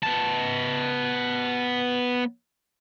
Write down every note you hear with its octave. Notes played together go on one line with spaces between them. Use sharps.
B3 A5